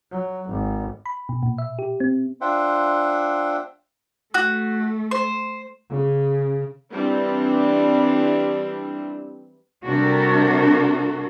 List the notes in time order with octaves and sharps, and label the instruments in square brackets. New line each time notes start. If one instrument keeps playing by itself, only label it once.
[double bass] F#3
G#1
[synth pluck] B5
B2
A#2
E5
G4
C4
[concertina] D4 F4 C5 E5 F#5 G5
[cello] A3 [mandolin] F#4
[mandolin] C5
[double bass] C#3
[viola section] E3 G3 C4 D4
[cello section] C3 G3 D4 F#4 A4 A#4